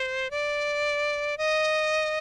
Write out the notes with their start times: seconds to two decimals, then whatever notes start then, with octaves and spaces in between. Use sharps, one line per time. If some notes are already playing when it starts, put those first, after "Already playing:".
Already playing: C5
0.31 D5
1.38 D#5